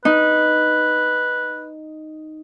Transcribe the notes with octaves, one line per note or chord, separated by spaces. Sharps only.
D#4 B4